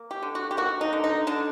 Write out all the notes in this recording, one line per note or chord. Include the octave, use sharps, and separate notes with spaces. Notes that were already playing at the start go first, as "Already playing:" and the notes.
Already playing: A#3
G4
D3
F#4
G4
A#3 F#4
D#4
D3
D#4
D3 D4